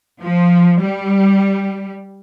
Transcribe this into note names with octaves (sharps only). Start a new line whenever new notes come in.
F3
G3